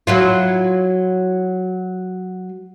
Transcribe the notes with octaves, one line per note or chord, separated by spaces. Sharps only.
F#3 E4 F4